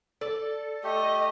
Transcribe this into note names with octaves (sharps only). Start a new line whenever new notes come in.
A4 D5
A3 G4 D#5